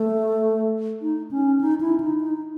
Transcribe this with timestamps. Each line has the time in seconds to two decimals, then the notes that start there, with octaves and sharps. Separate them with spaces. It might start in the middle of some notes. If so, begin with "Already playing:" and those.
Already playing: A3
1.02 D#4
1.31 C#4
1.61 D#4
1.81 E4
2.00 D#4
2.20 D#4